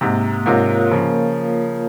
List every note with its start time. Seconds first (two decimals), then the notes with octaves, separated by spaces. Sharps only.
0.01 G#2 C3 A#3
0.46 G#2 C3 F4 A#4 C#5 F5
0.91 C#3 F3 A#3